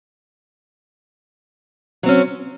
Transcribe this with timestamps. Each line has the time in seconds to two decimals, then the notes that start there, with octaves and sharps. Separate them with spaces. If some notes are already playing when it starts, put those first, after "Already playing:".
2.03 F#3
2.06 C4
2.08 C#4